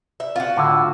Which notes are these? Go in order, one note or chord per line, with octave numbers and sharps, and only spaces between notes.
E5
F4 F#4
A2 D3 F#5 D6 E6